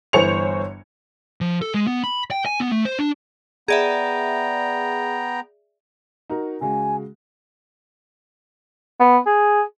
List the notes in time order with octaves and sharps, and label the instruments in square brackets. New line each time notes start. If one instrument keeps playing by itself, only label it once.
[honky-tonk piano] G1 E3 C5 C#5 C#7 F7
[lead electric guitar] F3
A4
G#3
B3
B5
G5
G#5
B3
A3
C5
D4
[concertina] B3 G5 A#5 [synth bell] G#4 D5 E5
[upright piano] D#4 F#4 A#4
[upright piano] C#3 G#3 F#4 [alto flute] G#5
[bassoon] B3
G#4